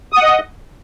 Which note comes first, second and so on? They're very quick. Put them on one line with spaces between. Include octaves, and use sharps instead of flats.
D#6 F#5 D#5